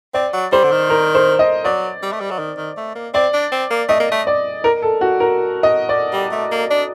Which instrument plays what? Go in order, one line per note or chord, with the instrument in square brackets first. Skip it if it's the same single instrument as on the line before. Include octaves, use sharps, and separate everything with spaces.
[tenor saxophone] C4 [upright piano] D5
[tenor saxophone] F#3
[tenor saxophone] G3 [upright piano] C5
[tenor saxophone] D3
D#3
[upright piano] A#4
C5
D#5
[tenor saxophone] F#3 [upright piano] D5
[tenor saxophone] G3
A3
G3
F#3
D#3
D#3
A3
A#3
[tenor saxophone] C4 [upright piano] D5
[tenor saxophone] D4
C4
A#3
[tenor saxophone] A3 [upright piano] D#5
[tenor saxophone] A#3
A3
[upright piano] D5
A#4
A4
F#4
A#4
D#5
D5
[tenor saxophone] G3
A3
A#3
D4